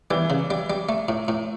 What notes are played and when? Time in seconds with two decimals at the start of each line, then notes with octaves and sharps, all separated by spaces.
0.11 E3 G3
0.30 C#3
0.50 G3
0.70 G3
0.89 A3
1.09 A2
1.28 A2